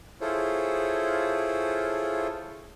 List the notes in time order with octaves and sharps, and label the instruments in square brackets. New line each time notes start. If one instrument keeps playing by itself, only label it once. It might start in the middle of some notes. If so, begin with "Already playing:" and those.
[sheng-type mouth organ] E4 F4 G#4 A4 C5 C#5